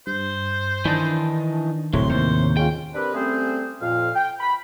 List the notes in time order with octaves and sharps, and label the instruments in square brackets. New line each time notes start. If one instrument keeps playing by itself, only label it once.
[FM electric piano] G2 [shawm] C5
[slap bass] D#3 [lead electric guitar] E3 D#4 [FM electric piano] D4 A5
[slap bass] D1 [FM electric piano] A2 C#5 [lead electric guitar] C3 [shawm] C6
[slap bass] D#2 [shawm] C5
[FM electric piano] G#3 C#4 F4 [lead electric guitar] G5
[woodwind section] C4 D4 G4 A#4 B4
G3 A3 C4 C#4 G#4 C5
F2 A#2 F5
G5
B5